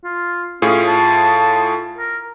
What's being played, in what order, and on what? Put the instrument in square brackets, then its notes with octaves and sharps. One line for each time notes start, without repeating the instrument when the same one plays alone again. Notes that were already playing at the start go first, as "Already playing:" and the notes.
[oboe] F4
[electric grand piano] A2 F4 G#4 [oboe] C#4
[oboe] A5
A#4